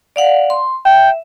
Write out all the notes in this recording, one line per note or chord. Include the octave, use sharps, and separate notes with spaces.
D5 F5 F#5
C6
E5 G5